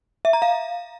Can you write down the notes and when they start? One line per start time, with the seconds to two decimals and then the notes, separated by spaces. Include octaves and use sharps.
0.25 E5
0.33 A#5
0.42 F5